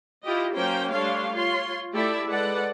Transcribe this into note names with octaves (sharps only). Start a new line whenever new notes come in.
E4 F4 G4 D#5
F#3 A#3 C#4 C5 G5
G3 A3 D4 C#5 F5 C6
F4 C#5 C6
A3 E4 G4 A4 D5 E5
G#3 A4 B4 D5 F#5